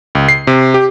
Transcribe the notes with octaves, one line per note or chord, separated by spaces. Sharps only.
C#2
C7
C3
G4